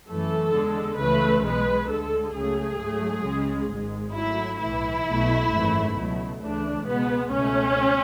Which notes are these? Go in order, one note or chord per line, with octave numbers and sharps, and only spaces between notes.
F#2 E3 A3 A4
E2 D3 G#3
C#2 C#3 E3 A3 B4
B1 B2 G#3 B4
D2 D3 G#3 A4
C#2 C#3 F#3 A3 G#4
G#2 F#3 A3
C#2 C#3 G#3
G#1 G#2 G#3
G#2 F#3 A3 E4
B1 A2 E3 E4
B1 B2 A3
G#1 F#2 E3 A3
C#2 B2 F#3 A3
D2 C#3 E3 A3 D4
C#2 B2 G#3 B3
C#2 B2 A3 C#4